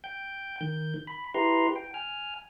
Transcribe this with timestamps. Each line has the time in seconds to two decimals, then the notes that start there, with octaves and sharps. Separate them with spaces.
0.04 G5 G6
0.61 D#3 G6
1.07 B5
1.34 E4 G4 B4 A#5 C6
1.76 G5
1.94 G#5 F6